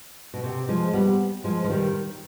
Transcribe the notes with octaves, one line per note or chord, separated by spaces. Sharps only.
B2
C3
F3 G#3
G3 B3
F3 G#3
F3
D#3 G3